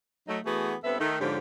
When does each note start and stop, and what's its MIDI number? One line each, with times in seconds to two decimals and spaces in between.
0.28 0.39 54
0.28 0.39 57
0.28 0.39 63
0.45 0.74 52
0.45 0.74 57
0.45 0.74 59
0.45 0.74 66
0.45 0.74 68
0.84 0.99 43
0.84 0.99 59
0.84 0.99 60
0.84 0.99 69
0.84 0.99 71
0.84 0.99 76
0.99 1.17 51
0.99 1.17 57
0.99 1.17 63
1.20 1.38 44
1.20 1.38 50
1.20 1.38 53
1.20 1.38 61
1.20 1.38 67